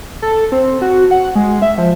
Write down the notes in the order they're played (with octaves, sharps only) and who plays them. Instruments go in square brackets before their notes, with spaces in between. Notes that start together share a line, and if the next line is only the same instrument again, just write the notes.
[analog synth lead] A4
C4
F#4
F#5
G#3
E5
F3